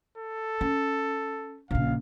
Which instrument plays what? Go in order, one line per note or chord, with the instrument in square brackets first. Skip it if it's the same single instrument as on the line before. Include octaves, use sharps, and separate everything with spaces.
[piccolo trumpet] A4
[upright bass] C#4
[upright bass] A#1 C#3 [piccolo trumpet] F5